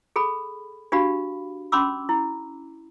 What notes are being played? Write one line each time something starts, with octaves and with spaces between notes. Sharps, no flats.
G#4 A4 B5
D4 F#4 G4 F5 B5
C#4 B5 C6 D6 E6
E4